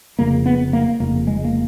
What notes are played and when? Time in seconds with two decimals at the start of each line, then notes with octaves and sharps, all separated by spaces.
0.19 F1 F2 C#3 A#3
0.46 B3
0.73 A#3
1.00 F1 F2 C#3 A#3
1.27 G#3
1.45 A#3